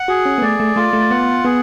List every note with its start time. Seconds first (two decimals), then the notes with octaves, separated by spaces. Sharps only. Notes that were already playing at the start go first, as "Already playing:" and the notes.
Already playing: F#5
0.08 F#4 G#4
0.25 C#4
0.38 B3
0.42 A3 D5
0.60 A3
0.76 A3 F4
0.93 A3
1.10 B3 F#5
1.44 B3 G#4